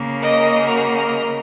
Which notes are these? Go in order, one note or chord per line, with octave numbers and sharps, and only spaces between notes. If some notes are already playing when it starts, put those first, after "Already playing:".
Already playing: C#3 A#3
A#4 D#5
F#4 A#4
A#4 D#5